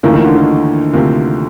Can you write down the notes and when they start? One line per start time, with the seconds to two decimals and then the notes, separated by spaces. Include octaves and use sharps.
0.03 D2 C#3 E3 F3 A#3 D#4
0.14 D#3
0.24 D3
0.36 D#3
0.93 D2 C3 F3 A#3